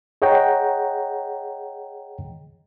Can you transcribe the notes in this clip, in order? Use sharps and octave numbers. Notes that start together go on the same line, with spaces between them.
G#4 C#5 D#5 F#5 G5 A#5